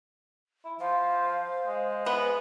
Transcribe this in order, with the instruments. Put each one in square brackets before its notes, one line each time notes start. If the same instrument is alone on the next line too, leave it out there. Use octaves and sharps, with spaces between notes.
[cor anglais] E4
[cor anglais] F3 [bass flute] C5 [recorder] F5
[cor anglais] G#3
[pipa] B3 [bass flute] E5 [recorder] B5